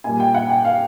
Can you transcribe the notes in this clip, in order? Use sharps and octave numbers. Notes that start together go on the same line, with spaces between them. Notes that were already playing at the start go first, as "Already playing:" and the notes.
A#2 G3 G#5
G5
F#5
G5
F5